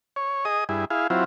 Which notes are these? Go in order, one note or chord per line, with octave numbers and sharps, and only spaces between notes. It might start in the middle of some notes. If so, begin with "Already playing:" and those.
C#5
G#4 D#5 D#6
G2 E4 G#4
E4 G#4 F5
F#3 C4 E4 F4